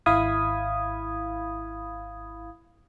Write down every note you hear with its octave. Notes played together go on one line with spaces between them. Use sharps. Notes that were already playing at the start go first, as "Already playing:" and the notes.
G#1 E4 F5 B5 D#6 G#6